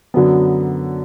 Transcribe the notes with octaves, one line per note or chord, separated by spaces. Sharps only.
F#2 D3 F#3 B3